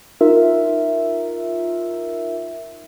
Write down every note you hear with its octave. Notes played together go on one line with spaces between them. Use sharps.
D#4 F4 A#4 E5